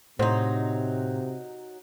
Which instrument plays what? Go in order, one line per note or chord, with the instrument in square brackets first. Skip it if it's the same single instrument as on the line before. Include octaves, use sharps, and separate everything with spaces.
[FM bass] A2 [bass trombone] C3 [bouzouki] F#3 D#4 [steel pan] C5